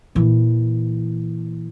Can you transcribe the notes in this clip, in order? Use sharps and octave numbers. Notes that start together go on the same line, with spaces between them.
A#2 E3